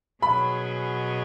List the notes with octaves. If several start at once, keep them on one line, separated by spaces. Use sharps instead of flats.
B2 F#3 C#4 G#4 B5